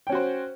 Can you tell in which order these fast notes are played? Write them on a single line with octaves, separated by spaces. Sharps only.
G5 C#4 F#4 C5